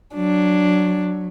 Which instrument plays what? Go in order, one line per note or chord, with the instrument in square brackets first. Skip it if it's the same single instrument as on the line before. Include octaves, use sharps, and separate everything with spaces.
[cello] F#3 [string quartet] D4